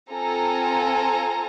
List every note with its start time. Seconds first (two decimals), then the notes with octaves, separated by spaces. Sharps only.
0.11 C4 F4 A4 G#5 A#5